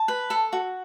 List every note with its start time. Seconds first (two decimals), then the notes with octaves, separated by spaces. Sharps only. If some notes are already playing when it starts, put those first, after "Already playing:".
Already playing: A5
0.08 B4
0.30 A4
0.53 F#4